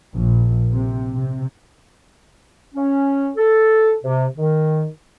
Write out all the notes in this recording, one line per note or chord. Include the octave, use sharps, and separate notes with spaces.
A#1
C3
C3
C#4
A4
C3
D#3